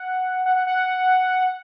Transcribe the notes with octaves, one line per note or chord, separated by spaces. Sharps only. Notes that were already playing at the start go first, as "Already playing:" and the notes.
Already playing: F#5
F#5
F#5
F#5